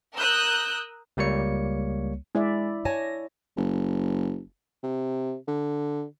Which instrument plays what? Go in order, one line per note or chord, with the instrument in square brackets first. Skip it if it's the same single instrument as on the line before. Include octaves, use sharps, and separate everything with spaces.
[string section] A#4 D#6 E6 F#6 G6
[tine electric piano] C#2 G3 A#3 C#5 C#7
[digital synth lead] G#3 [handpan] E4 D5 E5
[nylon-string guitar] C#5 G#5 A5 [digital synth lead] A#6
[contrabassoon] F#1
C3
D3